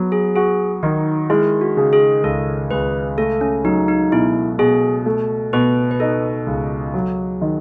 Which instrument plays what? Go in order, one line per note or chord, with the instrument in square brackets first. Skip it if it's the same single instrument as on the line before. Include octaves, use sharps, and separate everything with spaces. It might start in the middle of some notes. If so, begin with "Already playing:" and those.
Already playing: [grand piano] F#3 B3
[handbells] G#4
[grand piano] F#4 [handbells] G#4
[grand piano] D#3 [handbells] D#4
[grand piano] G#3 [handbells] E4
[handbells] F#4
[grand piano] C#3
[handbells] G#4
[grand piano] C#2 [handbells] A4
[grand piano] C#2 [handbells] B4
[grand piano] A3 [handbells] A4
[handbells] C#4
[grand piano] F#3 [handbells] D#4
[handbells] D#4
[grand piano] B2 [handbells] E4
[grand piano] B2 [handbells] G#4
[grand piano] A3
[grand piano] B2 [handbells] B4
[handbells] B4
[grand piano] D#4 [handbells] A4
[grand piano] C#2
F#3
D#3